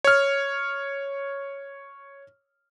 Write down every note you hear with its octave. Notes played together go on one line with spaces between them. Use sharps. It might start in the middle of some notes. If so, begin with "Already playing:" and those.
C#5 F6